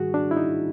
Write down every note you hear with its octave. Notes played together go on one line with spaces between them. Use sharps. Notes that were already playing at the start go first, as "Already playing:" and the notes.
Already playing: G#2 D#3 G3 F#4 G#4
D4
E4
D#4